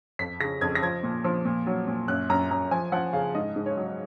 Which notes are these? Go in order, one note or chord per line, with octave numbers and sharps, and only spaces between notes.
F2 B6
C#3 A#6
F2 G#6
A#6
F3 G#6
A#2
F3
A#2
F#3
A#2
F#2 F#6
F#2 A#5
F#2 A#5
F3 G#5
F3 F#5
C#3 F5
G#2 D#5
G#2
C#5
F#3